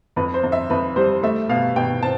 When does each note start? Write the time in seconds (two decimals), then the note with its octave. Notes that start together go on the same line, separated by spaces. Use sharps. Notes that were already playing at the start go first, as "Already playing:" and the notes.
0.16 F2 B4
0.34 C5
0.43 F2
0.52 E5
0.70 F2 B4
0.96 G3 C5
1.23 A3 E5
1.49 B2 F5
1.76 B2 G5
2.03 C4 A5